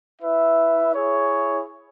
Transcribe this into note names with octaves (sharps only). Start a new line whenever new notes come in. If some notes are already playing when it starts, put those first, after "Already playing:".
E4 B4 E5
E4 G#4 C#5